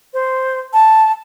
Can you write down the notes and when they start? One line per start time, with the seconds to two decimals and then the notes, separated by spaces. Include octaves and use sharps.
0.14 C5
0.73 A5